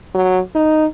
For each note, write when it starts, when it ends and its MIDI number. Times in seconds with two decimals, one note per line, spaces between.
0.14 0.39 54
0.55 0.86 63